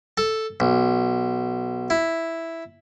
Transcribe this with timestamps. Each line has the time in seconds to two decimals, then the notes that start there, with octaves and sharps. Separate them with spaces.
0.17 A4
0.60 B1
1.90 E4